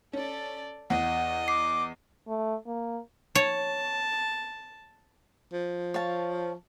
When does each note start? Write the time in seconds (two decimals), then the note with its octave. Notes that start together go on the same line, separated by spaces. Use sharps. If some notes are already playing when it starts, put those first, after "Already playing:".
0.13 C#4 A4 D5
0.90 E2 D#5 F#5
1.48 D6 C7
2.27 A3
2.67 A#3
3.35 C#5 A5
5.53 F3
5.94 C#5 F5 A5